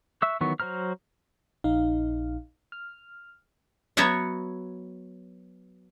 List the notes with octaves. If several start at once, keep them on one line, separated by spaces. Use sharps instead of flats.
E5 C#6 E6 F#6
D#3 E3 F#3 B3 C#6
F#3 F#4 C5 A#5 F6
A#1 D#4 F5
F6
F#3 B3 F#4 C#5 E5 F#5